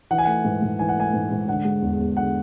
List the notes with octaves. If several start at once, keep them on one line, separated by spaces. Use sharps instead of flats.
E3 F#5
G#5
A3 F#5
G#2
G#2
E3 G#5
F#5
A3 G#5
G#2
G#2
D3 F#5
G#3
E2
E2
D3 F#5